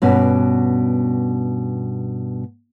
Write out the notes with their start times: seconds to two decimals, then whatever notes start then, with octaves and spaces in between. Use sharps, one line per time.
0.02 G2 B2 C#4